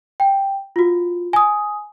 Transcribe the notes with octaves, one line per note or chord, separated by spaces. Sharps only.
G5
F4 F#4
G#5 D#6